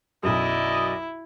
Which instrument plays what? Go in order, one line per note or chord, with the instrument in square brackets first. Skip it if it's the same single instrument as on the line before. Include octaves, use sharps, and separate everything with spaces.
[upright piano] B1 F#2 [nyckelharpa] E4 [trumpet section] D5 D#5